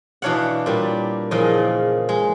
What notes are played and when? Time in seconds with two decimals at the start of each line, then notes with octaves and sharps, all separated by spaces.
0.22 B2 E3 D4 C#5 F5 F#5
0.66 A#2 G3 E5
1.31 E2 A#2 C#3 F3 D#5
2.09 G#3